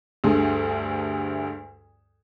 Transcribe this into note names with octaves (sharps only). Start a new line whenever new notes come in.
D2 G2 A3 G#4 C6